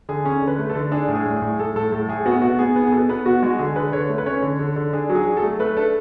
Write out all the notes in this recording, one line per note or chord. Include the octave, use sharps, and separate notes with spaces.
D3 G#4
C#4
D3
B4
A3
A4
D3
D4 G#4
A2
G#4
A2
G#4
A2
A2 A4
A2 A4
A2 A4
A2 G#4
B3 F#4
B2 F#4
B3 G#4
B3
G#4
B2 A4
B3 B4
B2 F#4
G#3 F#4
D3 G#4
D3 B4
D3 C#5
A3
B4
C#4 C#5
D3
D3
D3
D4 G#4
F#3
G#4
F#3
A4
A3
A3 B4
D4 A4